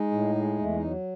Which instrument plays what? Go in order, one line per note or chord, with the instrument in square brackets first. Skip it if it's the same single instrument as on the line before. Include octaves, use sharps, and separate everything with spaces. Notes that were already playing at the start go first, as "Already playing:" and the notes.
Already playing: [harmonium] G#3 D#4
A2
G#3
E2 A3
D#4
F#3